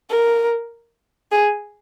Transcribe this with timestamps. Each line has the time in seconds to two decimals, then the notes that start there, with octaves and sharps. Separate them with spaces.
0.10 A#4
1.32 G#4